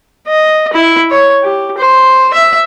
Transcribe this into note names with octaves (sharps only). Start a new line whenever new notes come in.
D#5
E4
C#5
G4
C5
E5